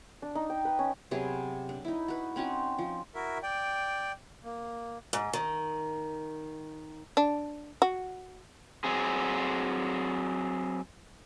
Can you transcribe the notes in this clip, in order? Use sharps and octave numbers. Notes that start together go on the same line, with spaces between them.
D4
D#4
G5
B4
C#4
C3 F#3 B3 G#4
D4
D#4 E4
F#4 B4
C4 C#4 D#4 F#4
F3
E4 F#4 A#4 E5
D5 G5
A#3
G#2
D#3
D4
F#4
F#3 C4 G#4